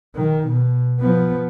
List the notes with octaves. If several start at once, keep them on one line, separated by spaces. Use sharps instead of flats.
D#3
B2
F3 B3